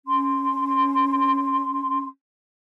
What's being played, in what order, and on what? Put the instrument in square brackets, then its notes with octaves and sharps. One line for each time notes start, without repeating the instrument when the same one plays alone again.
[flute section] C#4 C6